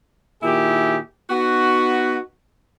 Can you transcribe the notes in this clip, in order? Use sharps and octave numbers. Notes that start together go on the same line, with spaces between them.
A#2 D#3 E4 G4 G#4
B3 D#4 F#4